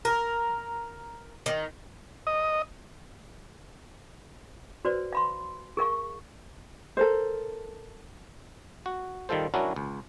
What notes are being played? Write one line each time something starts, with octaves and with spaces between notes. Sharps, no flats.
A#4
D#3
D#5
F#4 B4 C5 D5
F5 B5 C6
G#4 A#4 F5 C#6
A4 A#4 C5
F#4
D#3 G3 F4 A4 C5
F#3 C#4 D4 E4 F#4 A#4
C#2